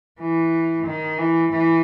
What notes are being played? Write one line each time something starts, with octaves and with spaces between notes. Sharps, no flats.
E3
D#3
E3
E3